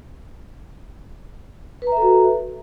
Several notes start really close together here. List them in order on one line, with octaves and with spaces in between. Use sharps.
B4 A#5 E5 A4 F#4